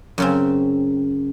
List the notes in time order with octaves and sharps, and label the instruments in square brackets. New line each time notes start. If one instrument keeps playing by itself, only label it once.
[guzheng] F#2 C#3 C4